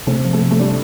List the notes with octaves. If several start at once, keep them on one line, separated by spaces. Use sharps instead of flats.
C3 A3
F3
A3
C3
A3
G3 D4